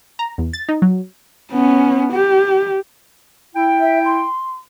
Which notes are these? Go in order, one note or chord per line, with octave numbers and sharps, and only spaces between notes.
A#5
E2
A6
D#4
F#3
B3 C#4
G4
E4 G5
E5
C6